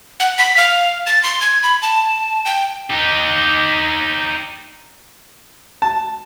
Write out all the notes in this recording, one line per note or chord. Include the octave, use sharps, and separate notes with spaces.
F#5
B6
F5
A6
C6
G#6
B5
A5
G5
D#4 G4
A5